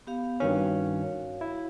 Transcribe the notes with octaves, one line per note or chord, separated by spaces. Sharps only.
B3 G4 F5
G2 D#3 C#4 F#4 C#5 F5
E4